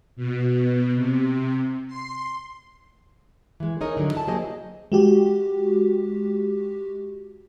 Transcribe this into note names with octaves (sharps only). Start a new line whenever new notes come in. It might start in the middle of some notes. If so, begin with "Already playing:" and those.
B2
C3
C6
E3 G#3
D#4 G#4 A#4 C#5 D#5
D3 F#3
E4 A5
F#3 A#3 G4 G#4 C5 D#5
G#3 F#4 G4